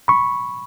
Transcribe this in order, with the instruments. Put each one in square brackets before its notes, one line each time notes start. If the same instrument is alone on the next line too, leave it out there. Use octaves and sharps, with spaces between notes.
[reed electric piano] B5 C#6